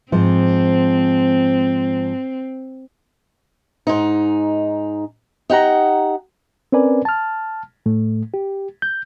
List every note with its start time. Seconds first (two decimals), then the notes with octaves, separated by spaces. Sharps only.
0.12 G#2 F3 C4
3.87 G#2 D#4
5.50 D#4 G4 F#5 A#5
6.72 C4 C#4 A#4 B4 D5 G#5
7.05 A5 F6
7.86 A2 A3
8.34 G4
8.82 G6